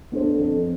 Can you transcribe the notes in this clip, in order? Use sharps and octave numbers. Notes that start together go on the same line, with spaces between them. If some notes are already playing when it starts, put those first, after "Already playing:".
B3 D4 A4 C5
F2